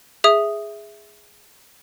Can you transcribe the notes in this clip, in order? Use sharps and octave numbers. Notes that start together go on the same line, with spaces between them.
G#4 E5 D#6